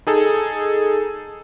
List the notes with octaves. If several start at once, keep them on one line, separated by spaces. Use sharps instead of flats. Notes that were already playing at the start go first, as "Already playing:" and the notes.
D#4 G#4 A4